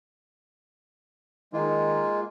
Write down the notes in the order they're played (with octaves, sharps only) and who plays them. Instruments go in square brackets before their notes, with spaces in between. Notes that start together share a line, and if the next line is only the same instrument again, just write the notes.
[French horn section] D#3 D#4 [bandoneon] G#3 A#3 F4